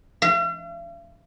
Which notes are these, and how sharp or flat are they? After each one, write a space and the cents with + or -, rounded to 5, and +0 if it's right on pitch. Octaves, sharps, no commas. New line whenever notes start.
F5 -45